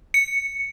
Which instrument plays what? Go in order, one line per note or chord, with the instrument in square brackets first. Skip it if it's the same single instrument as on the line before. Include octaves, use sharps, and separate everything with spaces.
[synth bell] C#7